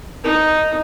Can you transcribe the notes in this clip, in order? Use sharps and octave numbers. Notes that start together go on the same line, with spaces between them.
D#4